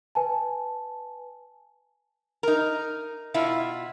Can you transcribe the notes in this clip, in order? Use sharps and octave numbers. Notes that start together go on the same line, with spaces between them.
B4 G#5 A5
D#4 A#4
B2 E4 F4